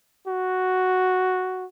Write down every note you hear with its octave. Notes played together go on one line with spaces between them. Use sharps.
F#4